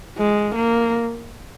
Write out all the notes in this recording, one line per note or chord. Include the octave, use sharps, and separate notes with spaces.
G#3
A#3